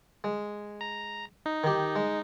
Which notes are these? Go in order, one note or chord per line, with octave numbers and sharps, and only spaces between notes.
G#3
A#5
D#4
D#3 G4
G#3